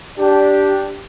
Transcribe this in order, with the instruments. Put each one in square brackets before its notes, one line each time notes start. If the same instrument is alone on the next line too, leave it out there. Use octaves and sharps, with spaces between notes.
[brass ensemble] D4 G4